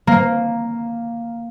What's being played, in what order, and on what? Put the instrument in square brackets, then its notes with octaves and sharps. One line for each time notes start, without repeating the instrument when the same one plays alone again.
[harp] A#3